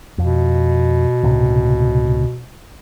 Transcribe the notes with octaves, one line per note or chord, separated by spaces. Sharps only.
F2 B2
C#2 A2 C3